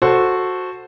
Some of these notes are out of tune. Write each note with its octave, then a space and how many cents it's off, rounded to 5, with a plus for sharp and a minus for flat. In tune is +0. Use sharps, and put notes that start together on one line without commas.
F#4 -10 A4 +0 C5 +0